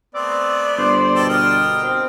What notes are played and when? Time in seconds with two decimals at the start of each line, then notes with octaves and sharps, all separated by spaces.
0.15 A3 B3 C4 D5
0.78 G1 C5
1.15 B2 A4 G5 A5
1.29 A#4 G5 D#6
1.83 C4